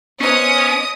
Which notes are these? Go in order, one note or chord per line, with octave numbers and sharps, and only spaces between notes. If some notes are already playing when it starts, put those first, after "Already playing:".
B3 C#4 C5 D#5 D#6